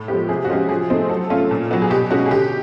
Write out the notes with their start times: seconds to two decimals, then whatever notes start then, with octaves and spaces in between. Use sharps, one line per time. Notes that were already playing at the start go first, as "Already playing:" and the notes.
Already playing: A2
0.08 F3 G#3 B3 G4
0.29 C3 G#4
0.37 G4
0.45 F#4
0.49 F3 G#3 C#4 F4 G4
0.69 F3 G#4
0.90 A3 C4 D#4
1.09 F#3 A4
1.30 A3 C#4 F4
1.51 A#2
1.71 F#3 B3
1.82 G#4
1.90 B2 G4
2.11 G#3 C#4 F#4
2.26 G#4
2.31 D3 G4